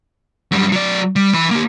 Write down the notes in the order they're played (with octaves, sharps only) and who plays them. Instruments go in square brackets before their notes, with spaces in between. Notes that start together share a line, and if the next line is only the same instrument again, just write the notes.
[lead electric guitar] F#2 G3
F#3 D5
G3
E3 B5
A#3 G4